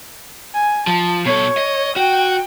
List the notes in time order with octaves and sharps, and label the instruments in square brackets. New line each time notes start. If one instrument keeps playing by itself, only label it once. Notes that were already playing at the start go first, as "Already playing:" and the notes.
[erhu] G#5
[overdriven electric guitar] F3 [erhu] A5
[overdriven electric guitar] B2 A4 [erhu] C#5
[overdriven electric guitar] D#5
[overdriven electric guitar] F#4 [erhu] G5